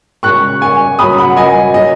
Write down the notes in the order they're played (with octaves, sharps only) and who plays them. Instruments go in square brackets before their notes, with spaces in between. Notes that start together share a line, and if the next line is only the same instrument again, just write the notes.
[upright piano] C#3 G#3 C#6 F#6
G#5 C#6
C#3 F#3 B5 D#6
F#5 B5
D#5 G#5
C#3 F#3 D#5